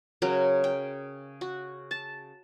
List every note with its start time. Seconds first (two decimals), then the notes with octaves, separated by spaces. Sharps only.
0.22 C#3 F#3 A#4
0.64 G5
1.41 F#4
1.91 A5